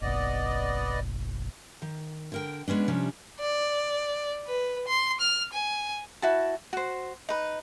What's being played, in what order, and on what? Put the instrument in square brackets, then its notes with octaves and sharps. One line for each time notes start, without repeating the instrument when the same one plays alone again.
[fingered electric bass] F#1 B1 [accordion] B3 D5 D#5
[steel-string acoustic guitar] D#3
D3 A#4 G5
G#3 B3 C#4 D4
C3 F3 G3 C#4 D4
[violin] D5
B4
C6
F6
G#5
[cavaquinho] E4 F#4 A5
F#4 C5
D#4 B4